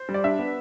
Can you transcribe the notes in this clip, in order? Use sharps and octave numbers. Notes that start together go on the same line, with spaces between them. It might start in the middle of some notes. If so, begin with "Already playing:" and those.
Already playing: C5
G3
D5
D4 E5
B3